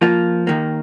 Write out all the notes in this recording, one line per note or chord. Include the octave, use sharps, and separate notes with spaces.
F3 A#3 F4
D#2 D#3 A#3